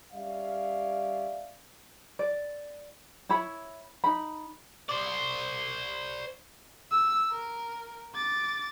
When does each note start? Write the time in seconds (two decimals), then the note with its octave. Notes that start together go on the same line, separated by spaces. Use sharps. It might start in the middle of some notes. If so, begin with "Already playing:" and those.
0.13 G3 C#4 D5 E5 F5
2.19 D5
3.29 E4 C#5 B5
4.04 D#4 B5
4.89 C5 D5
6.91 E6
7.31 A#4
8.15 D6 A6